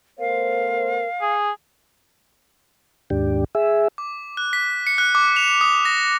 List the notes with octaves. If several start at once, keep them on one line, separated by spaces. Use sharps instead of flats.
A3 B3 A#4 C5 F5
G#4
D#2 G#2 D4 G4
G#4 E5
D6
F#6
B6
C#7
F#6
D6
F7
D#6
A#6